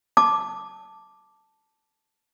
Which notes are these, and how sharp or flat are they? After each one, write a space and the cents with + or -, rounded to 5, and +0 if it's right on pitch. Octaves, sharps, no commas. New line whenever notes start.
A5 +0 D6 +0